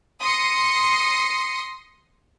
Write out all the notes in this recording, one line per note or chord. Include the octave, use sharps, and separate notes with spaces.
C6 D#6 A#6 C7 C#7